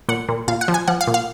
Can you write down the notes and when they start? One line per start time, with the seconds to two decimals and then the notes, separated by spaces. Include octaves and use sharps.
0.09 A#2 F#5
0.29 A#2
0.48 A#2 F5
0.61 F#5
0.68 F3
0.74 G#5
0.88 F3 F#5
1.01 F5
1.07 A#2
1.14 F5